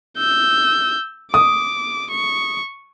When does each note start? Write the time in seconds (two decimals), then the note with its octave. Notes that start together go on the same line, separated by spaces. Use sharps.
0.18 E6 G6
1.34 D6 D#6
2.11 C#6